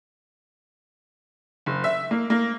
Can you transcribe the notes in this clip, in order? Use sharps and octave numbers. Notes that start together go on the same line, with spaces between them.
F#1
E5
A#3
A#3